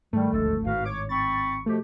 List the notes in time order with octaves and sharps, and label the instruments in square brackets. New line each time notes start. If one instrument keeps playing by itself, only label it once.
[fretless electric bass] G#2 [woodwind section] D#3 G3 [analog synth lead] A3
[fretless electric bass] D#1 G#1 D2 [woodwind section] F3 G#3 A4
[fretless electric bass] G#1 A2 D#3 [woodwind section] F#4 B4 F5
[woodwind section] C#5 [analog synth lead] D6
[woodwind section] C4 B5 C#6 [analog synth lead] A6
[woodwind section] B2 F3 G4 [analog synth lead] A3